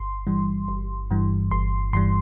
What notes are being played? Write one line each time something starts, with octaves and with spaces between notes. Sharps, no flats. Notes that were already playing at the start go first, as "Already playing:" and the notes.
Already playing: G1 C6
G2 E3 G3
G1
G2 E3 G3
G1 C6
G2 E3 G3 C6